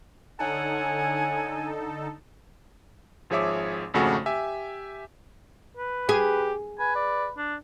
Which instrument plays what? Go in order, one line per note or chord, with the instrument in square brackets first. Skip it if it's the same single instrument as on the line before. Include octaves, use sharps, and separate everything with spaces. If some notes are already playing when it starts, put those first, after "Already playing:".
[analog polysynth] D3 D#4 A4 [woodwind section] C#5 F#5 G#5
[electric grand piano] G#1 F3 G#4 C#5 E5 D6
G#1 F2 C#3 A3 F#4
G4 E5 G#5
[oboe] B4
[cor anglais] G4 [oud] G#4
[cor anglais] B4 [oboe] G#5
[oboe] D5
D4